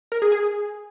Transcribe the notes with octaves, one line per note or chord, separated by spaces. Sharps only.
A#4
G#4
G#4